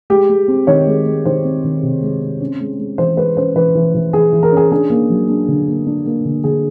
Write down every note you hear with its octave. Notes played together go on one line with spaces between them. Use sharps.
G#3 G4
G#3
C4
D#3 C#5
G#3
G#3
D#3 C5
C4
D#3
C3
G#3
C4
C#4
G#3
G#3
E3 C5
G#3 B4
C#4 C5
E3 B4
E3
E3
E3 G#4
E3
A#4
C#4 G#4
D4 G#4
A#3
F#3
D4
D3
A#3
D4
A#3
D3
D3 G#4